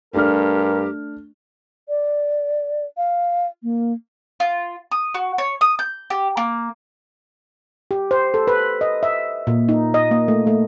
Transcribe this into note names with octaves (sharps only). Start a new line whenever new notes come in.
G2 A3 D4 G4 A#4 F6
D5
F5
A#3
F4
D#6
F#4
C#5
D#6
G6
G4
A#3
G4
C5
A4
B4
D#5
E5
A#2
D#4
D#5
A#3
A3
A3